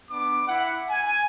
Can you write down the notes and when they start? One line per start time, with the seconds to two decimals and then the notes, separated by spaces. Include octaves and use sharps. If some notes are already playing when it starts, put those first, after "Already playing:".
0.11 B3 D4 D6
0.48 E4 F#5
0.90 G#5